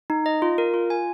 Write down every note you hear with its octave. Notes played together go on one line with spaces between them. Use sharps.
D#4
D#5
F4
A#4
F4
G#5